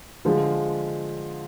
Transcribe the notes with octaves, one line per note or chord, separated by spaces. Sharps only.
D3 F3 G#3